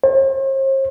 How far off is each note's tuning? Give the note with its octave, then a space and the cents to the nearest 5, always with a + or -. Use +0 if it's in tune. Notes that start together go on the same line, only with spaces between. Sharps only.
C5 +45